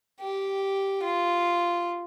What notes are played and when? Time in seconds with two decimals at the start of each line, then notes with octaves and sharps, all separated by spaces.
0.21 G4
1.03 F4